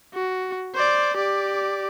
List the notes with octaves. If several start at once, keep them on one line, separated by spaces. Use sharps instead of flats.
F#4
C5 D5
G4 D5